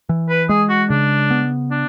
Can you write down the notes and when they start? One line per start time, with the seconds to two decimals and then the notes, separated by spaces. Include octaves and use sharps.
0.09 E3
0.29 B4
0.49 G#3 G#4
0.69 F#4
0.90 C#3 D4
1.30 B3
1.71 D4